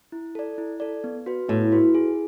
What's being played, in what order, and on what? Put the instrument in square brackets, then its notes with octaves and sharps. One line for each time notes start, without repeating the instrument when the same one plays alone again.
[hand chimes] E4
A4 D5
E4
A4 D5
B3
F#4 B4
[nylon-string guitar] A2 [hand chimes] B3
[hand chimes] F#4 B4
G#4